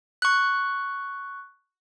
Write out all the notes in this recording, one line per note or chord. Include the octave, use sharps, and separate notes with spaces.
C#6 F#6